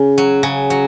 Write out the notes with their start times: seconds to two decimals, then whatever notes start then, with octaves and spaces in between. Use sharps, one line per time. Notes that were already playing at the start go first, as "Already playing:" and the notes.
Already playing: C#3
0.18 F#3
0.43 C#3
0.70 F#3